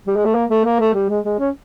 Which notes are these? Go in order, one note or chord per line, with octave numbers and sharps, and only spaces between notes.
G3
G#3
A3
A#3
A3
A#3
A3
G3
G#3
G#3
C#4